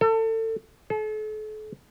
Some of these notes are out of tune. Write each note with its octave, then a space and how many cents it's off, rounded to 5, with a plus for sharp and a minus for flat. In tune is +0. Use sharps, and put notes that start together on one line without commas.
A4 +30
A4 -40